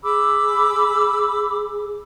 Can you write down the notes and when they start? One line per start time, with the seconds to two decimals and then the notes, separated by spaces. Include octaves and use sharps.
0.04 G#4 B5 D6 E6